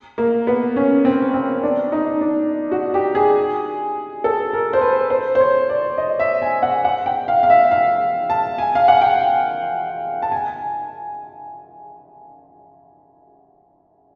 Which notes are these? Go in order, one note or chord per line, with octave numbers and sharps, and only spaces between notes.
A#3
B3
C#4
C4
C4
D4
D#4
D4
F#4
G4
G#4
A4
A#4
C5
B4
C5
C5
C#5
D5
D#5
E5
G#5
F#5
F#5
G5
F5
F5
E5
F5
A5
G#5
F5
F#5
G5
A5
G#5